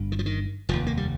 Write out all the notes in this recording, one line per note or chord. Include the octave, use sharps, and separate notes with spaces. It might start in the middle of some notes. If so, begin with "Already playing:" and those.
Already playing: G1 G2
D#3
F3
D#3
F1 D#2 F3
A#3
G3